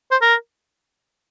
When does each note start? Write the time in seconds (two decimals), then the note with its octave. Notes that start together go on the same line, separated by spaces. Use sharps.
0.11 C5
0.21 A#4